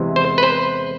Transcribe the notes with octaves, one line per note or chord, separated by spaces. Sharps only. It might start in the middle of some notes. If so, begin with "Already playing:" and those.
Already playing: E2 C3 E3 G#3
C5
B4
C5